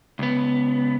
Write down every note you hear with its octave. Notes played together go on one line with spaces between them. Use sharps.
C#2 B3